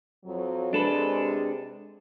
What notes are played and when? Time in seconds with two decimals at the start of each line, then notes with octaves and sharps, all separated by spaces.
0.24 F2 F#3
0.73 C3 G#3 D4 A4 B4